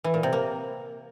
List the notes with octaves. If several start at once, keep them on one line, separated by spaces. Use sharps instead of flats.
E3
A#2
C3
A#3